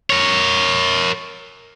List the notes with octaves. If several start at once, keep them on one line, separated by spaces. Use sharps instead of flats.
A#4 C#5